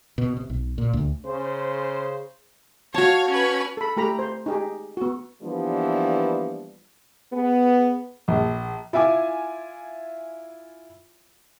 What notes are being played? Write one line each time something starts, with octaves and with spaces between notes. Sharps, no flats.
B2
C3
B1
A#2
D2
C#3 C5
F#4 C#5 F5 A5
C#4 B4
A4 B5
A3 G4 A#5 B5
C5
D#4 G4 G#4
B3 F#4
E3 F3 G3 A#3 B3 D4
B3 G#4
A#1
E4 F4 E5 G#5 D6